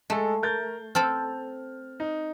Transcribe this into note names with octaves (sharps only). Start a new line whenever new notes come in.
G#3 A3 G#4 A4
A#4 G6 A6
C4 A4 C5 F6
D#4